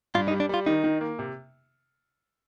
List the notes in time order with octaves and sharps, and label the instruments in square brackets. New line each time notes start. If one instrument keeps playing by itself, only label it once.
[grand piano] G2 [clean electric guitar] F4
[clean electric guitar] D#4
[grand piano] G3
[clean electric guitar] D4
[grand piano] G3 [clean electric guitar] F4
[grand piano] D#3 [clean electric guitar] D#4
[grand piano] D#3
A#3
C3